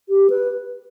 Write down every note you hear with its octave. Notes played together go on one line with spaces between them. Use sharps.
G4
B4